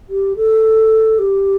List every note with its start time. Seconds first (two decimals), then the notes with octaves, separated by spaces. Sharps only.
0.09 G4
0.36 A4
1.19 G4